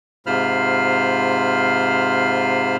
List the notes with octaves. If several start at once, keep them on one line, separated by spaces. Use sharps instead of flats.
G#2 C3 F4 C5 B5 F6